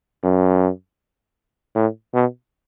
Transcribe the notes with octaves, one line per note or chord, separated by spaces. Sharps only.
F#2
A2
B2